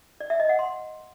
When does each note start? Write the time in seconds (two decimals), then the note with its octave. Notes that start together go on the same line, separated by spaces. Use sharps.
0.20 D5
0.30 E5
0.40 D#5
0.49 F#5
0.59 C6